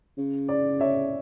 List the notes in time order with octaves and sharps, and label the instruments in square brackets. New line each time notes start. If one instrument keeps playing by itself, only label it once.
[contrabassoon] C#3
[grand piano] D5
C#5 E5